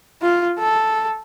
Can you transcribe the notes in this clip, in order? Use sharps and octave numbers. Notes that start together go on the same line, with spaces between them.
F4
A4